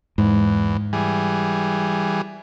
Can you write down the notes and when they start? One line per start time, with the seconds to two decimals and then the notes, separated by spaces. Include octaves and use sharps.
0.18 E2 G#2
0.93 E3 G3 G#4